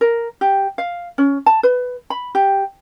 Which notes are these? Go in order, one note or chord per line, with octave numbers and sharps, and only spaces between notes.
A#4
G4
F5
C#4
A5
B4
B5
G4